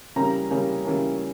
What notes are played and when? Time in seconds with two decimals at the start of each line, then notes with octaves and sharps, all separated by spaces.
0.16 C#3 E3 G3 A#3 C#4 A#5
0.50 C#3 E3 G3 A#3 C#4
0.85 C#3 E3 G3 A#3 C#4